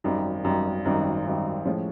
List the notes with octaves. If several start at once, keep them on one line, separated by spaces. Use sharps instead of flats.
G#1 F#2 D#3 G3
G#1 F#2 D#3 G3
G#1 F#2 D#3 G3
G#1 F#2 D#3 G3
A2 F3 G#3 C#4 F4